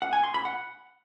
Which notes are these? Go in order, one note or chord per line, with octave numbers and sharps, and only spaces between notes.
F#5
G#5
C6
B5
F#5